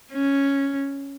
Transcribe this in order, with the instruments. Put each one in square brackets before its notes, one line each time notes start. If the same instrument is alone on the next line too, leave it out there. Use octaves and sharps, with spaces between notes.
[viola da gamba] C#4